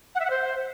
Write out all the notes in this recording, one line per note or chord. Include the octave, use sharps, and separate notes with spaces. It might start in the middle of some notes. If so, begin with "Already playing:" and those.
F#5
E5
F#5
C5